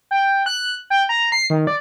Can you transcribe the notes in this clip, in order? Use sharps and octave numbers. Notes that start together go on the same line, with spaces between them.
G5
F#6
G5
A#5
C7
D#3
D5